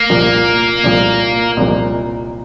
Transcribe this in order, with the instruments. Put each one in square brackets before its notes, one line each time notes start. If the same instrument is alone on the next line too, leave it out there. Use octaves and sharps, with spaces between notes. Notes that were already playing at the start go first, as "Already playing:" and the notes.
Already playing: [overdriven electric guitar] A#3
[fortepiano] C2 A#2 F3
C2 A#2 F3
C2 A#2 F3